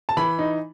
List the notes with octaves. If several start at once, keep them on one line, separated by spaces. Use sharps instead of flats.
A5
E3 B5
D#4